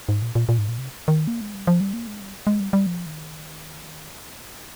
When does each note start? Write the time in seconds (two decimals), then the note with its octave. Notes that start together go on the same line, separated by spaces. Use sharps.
0.09 G#2
0.22 A#2
0.35 A#2
0.49 A#2
0.58 G#2
0.69 A#2
0.78 C3
1.08 D#3
1.27 A#3
1.41 G#3
1.54 G3
1.67 F3
1.80 G3
1.93 A#3
2.07 G#3
2.21 G3
2.47 G#3
2.60 G3
2.73 G3
2.86 F3
3.06 D#3